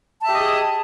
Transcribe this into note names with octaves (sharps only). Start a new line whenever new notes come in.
G4 G#4 D#5 E5 A5